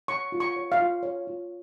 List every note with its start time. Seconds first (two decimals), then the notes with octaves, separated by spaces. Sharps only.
0.08 C#5 C#6
0.32 F4
0.40 C#6
0.56 C#5
0.72 F5
0.80 F4
1.03 C#5
1.27 F4